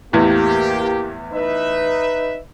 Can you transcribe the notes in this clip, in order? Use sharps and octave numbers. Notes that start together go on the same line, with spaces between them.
E2 A2 A#3 G4
D#4 B4 E5